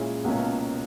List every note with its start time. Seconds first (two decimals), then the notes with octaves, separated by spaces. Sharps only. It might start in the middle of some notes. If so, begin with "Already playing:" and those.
Already playing: A#2 G#3 C#4 E4
0.24 C#2 B2 A#3 C#4